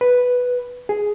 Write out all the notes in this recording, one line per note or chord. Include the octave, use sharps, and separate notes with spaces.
B4
G#4